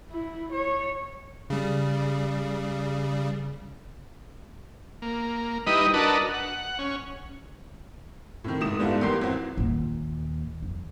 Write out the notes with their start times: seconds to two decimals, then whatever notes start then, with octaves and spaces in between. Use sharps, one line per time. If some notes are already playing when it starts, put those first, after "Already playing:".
0.11 E4
0.53 C#5
1.50 C#3 G3
5.02 A#3
5.67 G3 D#4 E4 B4 D#5
5.94 D4 F#4 A#4 B4 D#5 A5
6.34 F#5
6.79 C#4
8.44 A2 C3 D#3
8.61 F1 G#2 E4 D#6 E7
8.79 G#2 G3 A3 B3 E4 F4
9.01 E2 B3 G4 A#4 C6 C7
9.21 G#1 F#3 C4 E4 F#4
9.58 D#2 A#2
10.63 F2